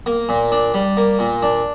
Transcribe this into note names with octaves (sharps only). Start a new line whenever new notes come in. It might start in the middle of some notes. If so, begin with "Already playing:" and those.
A#3
A#2
D4
G3
A#3
A#2
D4